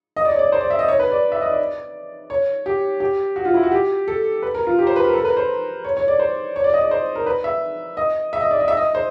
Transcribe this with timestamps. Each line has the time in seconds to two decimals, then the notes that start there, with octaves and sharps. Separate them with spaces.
0.16 D#5
0.25 D5
0.32 C#5
0.39 D5
0.52 C5
0.61 D5
0.70 E5
0.79 D#5
0.88 C#5
0.99 B4
1.11 D5
1.32 E5
1.41 D#5
1.50 D5
2.30 C#5
2.66 G4
3.00 G4
3.36 F#4
3.45 F4
3.54 E4
3.63 F#4
3.72 G4
4.08 A4
4.43 B4
4.55 A#4
4.67 F4
4.79 G4
4.87 C5
4.96 B4
5.05 A#4
5.13 A4
5.20 A#4
5.25 B4
5.37 C5
5.85 C#5
5.97 C#5
6.08 D5
6.19 C5
6.56 C#5
6.64 D5
6.74 D#5
6.81 D5
6.91 C5
7.15 A#4
7.26 B4
7.44 E5
7.97 D#5
8.33 E5
8.41 D#5
8.51 D5
8.59 D#5
8.68 E5
8.77 D#5
8.95 C5